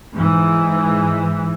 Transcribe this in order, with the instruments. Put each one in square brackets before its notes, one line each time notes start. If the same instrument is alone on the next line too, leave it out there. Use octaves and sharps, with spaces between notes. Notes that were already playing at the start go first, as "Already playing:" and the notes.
[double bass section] G#2 E3